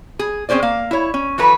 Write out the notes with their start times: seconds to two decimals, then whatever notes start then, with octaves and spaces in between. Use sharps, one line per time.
0.19 G#4
0.49 C4 C#4 G#4 C5 D5
0.62 A#3 F5
0.91 E4 C#5
1.14 C#4
1.38 E3 F#3 A4 B4